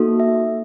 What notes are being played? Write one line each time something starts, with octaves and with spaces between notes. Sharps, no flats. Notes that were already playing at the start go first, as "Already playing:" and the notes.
Already playing: A#3 D#4 F#4 A4
E5